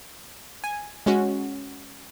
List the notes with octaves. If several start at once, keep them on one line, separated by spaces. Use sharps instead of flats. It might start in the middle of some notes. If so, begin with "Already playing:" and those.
G#5
G#3 C#4 F#4